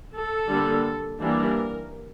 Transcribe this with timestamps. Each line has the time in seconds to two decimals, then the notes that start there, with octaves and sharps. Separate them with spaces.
0.14 A4
0.49 D3 G3 A#3
1.20 E3 G3 A#3 D4 A#4